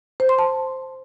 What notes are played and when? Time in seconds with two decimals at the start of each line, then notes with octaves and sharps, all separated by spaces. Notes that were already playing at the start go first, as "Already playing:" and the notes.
0.20 C5
0.29 C6
0.39 A5